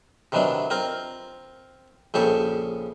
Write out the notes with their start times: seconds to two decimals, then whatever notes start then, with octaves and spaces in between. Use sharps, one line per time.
0.32 C3 D#3 E3 F#3 D4
0.70 C4 F4 A#4
2.14 A#1 C#3 G4 A4 C#6